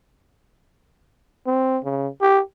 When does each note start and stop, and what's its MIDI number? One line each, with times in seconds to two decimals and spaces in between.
1.47 1.78 60
1.84 2.07 49
2.21 2.40 67